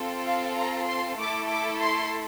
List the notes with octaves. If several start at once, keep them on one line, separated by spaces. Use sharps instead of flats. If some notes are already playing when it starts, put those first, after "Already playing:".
Already playing: C4 F4 A4
F5
A#5
C6
A3 E4 A4 D6
D6
C6